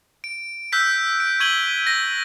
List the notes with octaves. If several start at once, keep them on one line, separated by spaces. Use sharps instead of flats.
D7
E6 F#6 G6 B6 D7
D7
C#6 G#6 D#7 F#7 G7
A#6